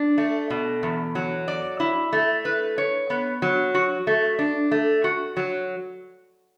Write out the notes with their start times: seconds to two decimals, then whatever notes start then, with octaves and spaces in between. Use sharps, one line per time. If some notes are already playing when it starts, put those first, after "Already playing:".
Already playing: D4
0.18 A3
0.50 B2
0.83 E2
1.15 F#3
1.48 D5
1.80 E4
2.13 A3
2.45 B4
2.78 C#5
3.10 B3
3.42 F#3
3.75 F#4
4.07 A3
4.39 D4
4.71 A3
5.04 F#4
5.37 F#3